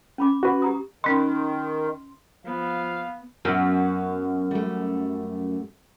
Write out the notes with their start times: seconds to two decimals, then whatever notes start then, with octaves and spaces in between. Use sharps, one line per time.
0.18 C#4 B5 D6
0.43 F#4 B4
0.62 G4 A#5 D#6
1.04 D#3 C#4 D#5 C6
2.46 F3 B3 F5
3.45 F#2 B3
4.51 G3 A3